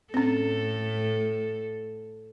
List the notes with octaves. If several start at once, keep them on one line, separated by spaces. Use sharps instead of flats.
A2 C4 C#4 A4